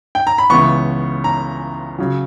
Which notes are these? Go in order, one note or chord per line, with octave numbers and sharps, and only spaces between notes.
G5
A#5
B5
C#2 C#3 E3 B3 C#6
A#5
C#3 F#3